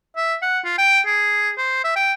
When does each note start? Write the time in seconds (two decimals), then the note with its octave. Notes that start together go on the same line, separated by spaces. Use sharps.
0.17 E5
0.42 F#5
0.65 F4
0.78 G5
1.06 G#4
1.58 C5
1.84 E5
1.96 G5